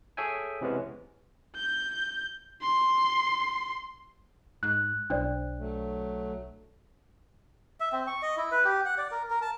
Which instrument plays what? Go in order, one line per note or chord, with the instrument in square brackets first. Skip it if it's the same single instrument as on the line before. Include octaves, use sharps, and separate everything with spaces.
[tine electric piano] G#4 A4 C#5 E5 G5 G#5
C3 E3 G#3 B3 C#4
[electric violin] G6
C6
[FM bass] G#2 [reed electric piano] F#6
[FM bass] B1 [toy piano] D4 C5 D5
[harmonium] F#3 A3
[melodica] E5
C4
C#6
D#5
E4
B4
G4
F#5
D5
A#4
A#4
A5